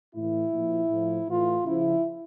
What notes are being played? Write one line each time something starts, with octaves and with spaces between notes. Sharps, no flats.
A2 E3 E4
A#2 F3
A2 F3
A2 E3 F4
C#3 F3 E4